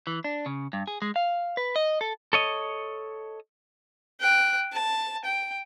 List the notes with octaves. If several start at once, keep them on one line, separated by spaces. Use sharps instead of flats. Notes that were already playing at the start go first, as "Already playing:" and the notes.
E3
D4
C#3
G2
G#4
G#3
F5
B4
D#5
A4
A4 C#5 D#5
G5 F#6
A5
G5